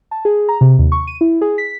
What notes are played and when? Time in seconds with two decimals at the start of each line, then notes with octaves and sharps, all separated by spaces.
0.11 A5
0.25 G#4
0.49 A#5
0.61 C3
0.79 D#2
0.92 C#6
1.07 D#7
1.21 E4
1.41 G#4
1.58 B6